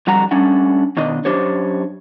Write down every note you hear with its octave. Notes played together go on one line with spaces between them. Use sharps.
F2 D3 G3 F#4 F#5 A#5
G3 A3 C#4 D4 F#5
B2 D#3 D4 D#5
F#2 D4 G4 C5 C#5